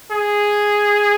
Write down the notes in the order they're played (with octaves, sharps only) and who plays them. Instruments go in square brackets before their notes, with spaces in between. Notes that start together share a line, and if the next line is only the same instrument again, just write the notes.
[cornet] G#4